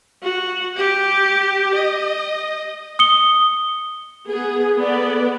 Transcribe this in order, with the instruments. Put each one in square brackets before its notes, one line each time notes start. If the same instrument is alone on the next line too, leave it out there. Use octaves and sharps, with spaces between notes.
[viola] F#4
G4
D#5
[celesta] D#6 C#7 G7
[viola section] B3 G#4
B3 A4 B4 D5